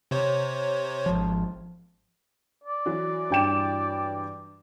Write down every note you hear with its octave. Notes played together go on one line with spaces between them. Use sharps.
C3 C5 C#5
G#1 F3
D5
E3 F#3
G2 G5 E7